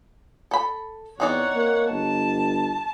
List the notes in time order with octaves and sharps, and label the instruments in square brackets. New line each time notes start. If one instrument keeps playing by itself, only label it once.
[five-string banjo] A4 B5
[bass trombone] E2 [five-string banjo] C4 D#4 D5 [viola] C#5 F#5
[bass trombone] A#3
[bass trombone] G1 [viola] A5